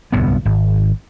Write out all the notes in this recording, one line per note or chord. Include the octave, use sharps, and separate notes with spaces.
D1 C2 G2 B3
G#1